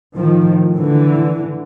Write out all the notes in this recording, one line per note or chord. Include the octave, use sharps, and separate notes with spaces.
A2 D#3 F3
D3 E3